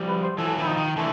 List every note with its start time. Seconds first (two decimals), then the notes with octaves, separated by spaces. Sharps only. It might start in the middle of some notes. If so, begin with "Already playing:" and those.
Already playing: F3 G3
0.08 B4
0.23 C5
0.38 E3 F#3 A4
0.57 D#3 F3 E4
0.67 D#4
0.77 D#3
0.97 D3 E3 A3